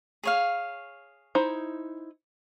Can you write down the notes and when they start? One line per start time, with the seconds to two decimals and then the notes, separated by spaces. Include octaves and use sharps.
0.24 G#4 C#5 F5
1.35 D#4 E4 C5